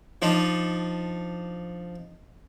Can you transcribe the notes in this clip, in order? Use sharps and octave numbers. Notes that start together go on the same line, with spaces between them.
F3 D4 D#4